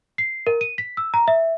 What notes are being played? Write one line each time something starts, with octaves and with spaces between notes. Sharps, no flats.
C7
A#4
D#7
B6
E6
A#5
E5